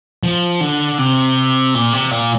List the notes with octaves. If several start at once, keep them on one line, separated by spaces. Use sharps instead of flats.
F3
D3
C3
A#2
C3
A#2